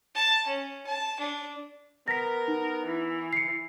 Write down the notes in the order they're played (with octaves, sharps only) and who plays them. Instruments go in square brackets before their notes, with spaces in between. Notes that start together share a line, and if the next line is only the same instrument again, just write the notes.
[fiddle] A5
C#4
A5
D4
[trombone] B3 [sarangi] A#4 [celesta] A#6 B6
[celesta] D#4
[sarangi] E3
[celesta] C7 C#7